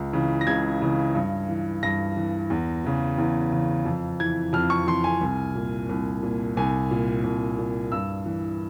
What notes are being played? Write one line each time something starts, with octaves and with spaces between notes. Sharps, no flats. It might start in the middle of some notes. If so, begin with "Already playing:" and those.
Already playing: C#2
C#3 E3
A#6
C#2 G#6
C#3 E3
G2
E3
G2 A#6
E3
E2
C#3 E3
E2
C#3 E3
F2
E3 G#6
F2 F6
C#6
E3 C6
G#5
C2
A#2
C2
A#2
C2 G#5
A#2
C2
A#2
G2 E6
E3